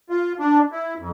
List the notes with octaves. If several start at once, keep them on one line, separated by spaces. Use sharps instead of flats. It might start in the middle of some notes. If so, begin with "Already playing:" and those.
F4
D4
E4
F2